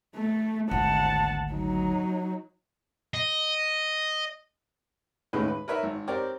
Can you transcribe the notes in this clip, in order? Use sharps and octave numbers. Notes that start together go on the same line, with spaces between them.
A3
G#1 D2 F#5 A5
F#3 D#4
D#5
D#2 A2 G#3 C#4 B4
B4
A#4 B4 C#5 E5
G#1
C4 G4 A#4 C#5 D5